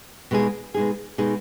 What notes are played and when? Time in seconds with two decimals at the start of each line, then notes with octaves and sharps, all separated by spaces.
0.31 B2 G#3 D#4 G#4
0.74 B2 G#3 D#4 G#4
1.18 B2 G#3 D#4 G#4